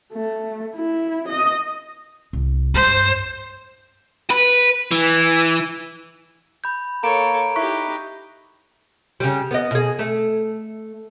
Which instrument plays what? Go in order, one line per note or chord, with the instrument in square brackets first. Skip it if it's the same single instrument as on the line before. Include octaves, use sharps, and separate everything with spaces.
[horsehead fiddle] A3
E4
D#5
[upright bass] C2
[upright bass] G2 [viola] C5
[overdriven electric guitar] B4
E3
[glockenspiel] B5 G6
[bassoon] A#3 [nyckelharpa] A4 C#5 [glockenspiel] A#5 D7
[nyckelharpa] D#4 G4 [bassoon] E4 [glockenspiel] C#6 F#6 B6
[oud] C#3 G3
B3 D#5
B2 G#4
A3